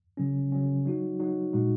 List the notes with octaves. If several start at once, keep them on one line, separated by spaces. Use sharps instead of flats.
C#3 F#3 C#4
C#3 F#3 C#4
F#3 D#4 F#4
F#3 D#4 F#4
A#2 G#3 D#4 F#4